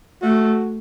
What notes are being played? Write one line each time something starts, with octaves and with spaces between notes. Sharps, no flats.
A3 F#4